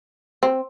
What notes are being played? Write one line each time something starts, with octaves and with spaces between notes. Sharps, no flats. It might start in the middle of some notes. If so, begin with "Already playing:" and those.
C4